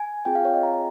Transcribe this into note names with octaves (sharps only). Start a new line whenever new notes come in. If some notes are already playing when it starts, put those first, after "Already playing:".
Already playing: G#5
C4 F4 G#4 G5
F5
C#5
D#5
A#5
A#5